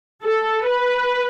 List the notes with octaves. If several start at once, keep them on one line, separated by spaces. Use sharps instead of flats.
A4
B4